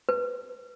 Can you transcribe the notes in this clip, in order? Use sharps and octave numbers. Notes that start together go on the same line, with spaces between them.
B4